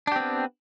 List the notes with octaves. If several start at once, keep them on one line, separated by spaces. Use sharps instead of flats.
B3 C4 D4 G4